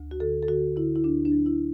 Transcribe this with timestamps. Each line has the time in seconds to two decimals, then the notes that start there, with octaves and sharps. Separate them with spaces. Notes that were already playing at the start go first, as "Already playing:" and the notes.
Already playing: D2
0.11 F#4
0.20 D3 A4
0.43 A4
0.48 D3 F#4
0.76 D3 E4
0.95 E4
1.04 D2 D4
1.25 D4
1.32 F#3
1.46 E4